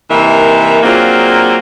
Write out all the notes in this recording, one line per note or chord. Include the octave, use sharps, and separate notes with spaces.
C3 E3 A#3 D#4 A#4 E5
F#3 A#3 C4 D4 F4 G#4